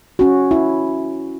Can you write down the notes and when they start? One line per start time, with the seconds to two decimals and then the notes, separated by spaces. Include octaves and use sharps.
0.19 C#4 F#4
0.51 E4